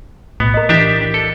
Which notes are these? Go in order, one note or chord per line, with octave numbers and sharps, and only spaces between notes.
B1 A2 B3
A#4 D#5
E3 D4 G4 E5
A4